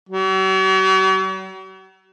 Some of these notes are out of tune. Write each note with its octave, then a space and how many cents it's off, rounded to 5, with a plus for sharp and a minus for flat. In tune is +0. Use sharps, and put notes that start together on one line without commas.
F#3 +45